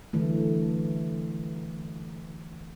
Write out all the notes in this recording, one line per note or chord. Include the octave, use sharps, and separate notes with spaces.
D3 E3 F#3 A3